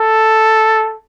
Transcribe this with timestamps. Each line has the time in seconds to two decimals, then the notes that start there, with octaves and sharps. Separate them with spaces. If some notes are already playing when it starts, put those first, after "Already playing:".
Already playing: A4